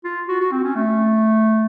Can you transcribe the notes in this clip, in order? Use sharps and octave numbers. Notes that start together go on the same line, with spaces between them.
F4
F#4
F#4
C4
C#4
A3